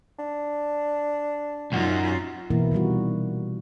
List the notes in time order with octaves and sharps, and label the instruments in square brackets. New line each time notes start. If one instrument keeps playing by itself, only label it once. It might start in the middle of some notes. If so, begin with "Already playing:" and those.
[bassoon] D4
[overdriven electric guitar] C#2 F#2 [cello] D#4 F4
[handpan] B2 E3 A#3 E4 A#4
C3 D#3 G3 F#4